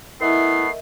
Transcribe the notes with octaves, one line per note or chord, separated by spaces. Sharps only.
A3 B3 E4 A#4 D#5 E5 C7